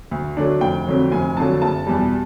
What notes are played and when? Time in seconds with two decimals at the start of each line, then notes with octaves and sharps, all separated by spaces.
0.11 D2
0.37 D3 F#3 A3 D4
0.61 F1 G5
0.87 F2 D3 F#3
1.12 F1 G#5
1.36 F2 D3 F#3 A5
1.62 F#1 A5
1.87 E2 B2 G3